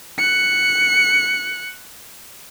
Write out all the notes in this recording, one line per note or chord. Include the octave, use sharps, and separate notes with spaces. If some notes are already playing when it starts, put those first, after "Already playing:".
F#6 C#7